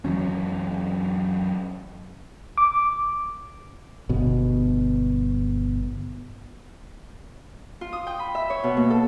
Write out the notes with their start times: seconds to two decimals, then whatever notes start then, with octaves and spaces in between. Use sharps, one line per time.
0.05 F#2 E3 F#3 C#4
2.58 D6
4.09 G1 B2
7.81 F4
7.93 D#6
8.07 G5
8.19 B5
8.35 E5
8.50 C#5
8.64 B2
8.77 A#3
8.90 A4